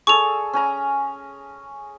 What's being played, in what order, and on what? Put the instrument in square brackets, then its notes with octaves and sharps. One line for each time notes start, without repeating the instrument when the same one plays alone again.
[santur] G#4 A4 D5 [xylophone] C#6 F7
[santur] C#4 G#5 A#5